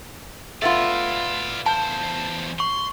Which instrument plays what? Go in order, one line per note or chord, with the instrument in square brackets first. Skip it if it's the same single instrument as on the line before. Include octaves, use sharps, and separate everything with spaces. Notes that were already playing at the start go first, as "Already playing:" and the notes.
[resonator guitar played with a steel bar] A3 B3 F4 [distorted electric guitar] D5 F5
[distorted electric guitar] E2 C5 [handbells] A5
[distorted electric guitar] C6 [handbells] C#6